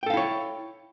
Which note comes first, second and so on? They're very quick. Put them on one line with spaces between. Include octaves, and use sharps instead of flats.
G5 A4 F5 E4 C#5